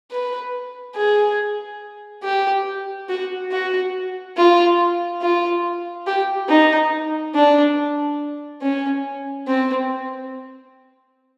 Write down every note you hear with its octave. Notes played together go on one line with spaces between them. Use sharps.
B4
G#4
G4
F#4
F#4
F4
F4
G4
D#4
D4
C#4
C4